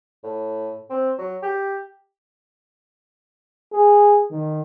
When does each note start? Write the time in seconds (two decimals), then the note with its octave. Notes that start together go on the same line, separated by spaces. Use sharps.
0.24 A2
0.90 C4
1.19 F#3
1.43 G4
3.72 G#4
4.31 D#3